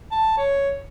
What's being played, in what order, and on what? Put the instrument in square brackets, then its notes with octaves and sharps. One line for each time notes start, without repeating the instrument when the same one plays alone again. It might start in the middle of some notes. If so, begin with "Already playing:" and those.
[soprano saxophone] A5
C#5